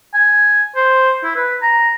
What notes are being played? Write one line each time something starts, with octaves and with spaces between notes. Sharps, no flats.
G#5
C5
E4
B4
A#5